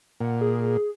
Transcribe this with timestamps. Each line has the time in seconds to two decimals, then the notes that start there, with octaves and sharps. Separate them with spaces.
0.20 A#2 F#5
0.41 G#4